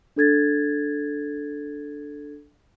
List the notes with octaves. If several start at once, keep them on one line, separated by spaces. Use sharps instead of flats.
D4 A4 G#6 A6